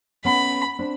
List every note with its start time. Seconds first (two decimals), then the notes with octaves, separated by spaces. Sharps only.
0.25 B3 C#4 B5
0.79 C4 D4